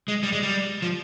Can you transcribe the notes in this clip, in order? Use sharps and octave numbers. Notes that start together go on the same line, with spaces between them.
G#3
G3
G#3
G3
F3